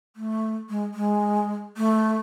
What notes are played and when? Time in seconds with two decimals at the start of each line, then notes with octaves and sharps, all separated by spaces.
0.16 A3
0.70 G#3
0.94 G#3
1.77 A3